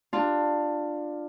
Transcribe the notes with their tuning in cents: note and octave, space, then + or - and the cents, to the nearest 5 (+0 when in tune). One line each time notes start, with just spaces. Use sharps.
D4 +15 F4 +0